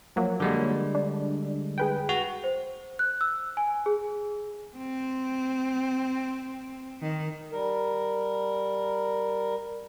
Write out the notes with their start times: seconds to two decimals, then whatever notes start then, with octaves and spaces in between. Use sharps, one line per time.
0.16 F3 F#3 A#3
0.40 D3 G3 G#3
0.95 D4
1.78 G#4 B4 G5
2.09 F#4
2.44 C5
2.99 F#6
3.21 E6
3.57 G#5
3.86 G#4
4.77 C4
7.02 D#3
7.52 G3 A#4